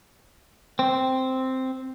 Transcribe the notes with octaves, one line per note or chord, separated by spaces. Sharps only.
C4